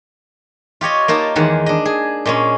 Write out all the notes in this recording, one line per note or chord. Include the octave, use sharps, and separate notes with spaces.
F4 G4 C#5 D#5
A#3 D#4 F4 A5
E2 D#3 G#3 F#5
D4 D#5
G#4
A#2 G#3 C#4